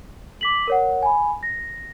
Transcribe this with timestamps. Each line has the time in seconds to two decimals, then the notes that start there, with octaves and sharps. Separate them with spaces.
0.41 D6 B6 F#7
0.67 A#4 C#5 F#5
1.03 G#5 B5
1.43 A#6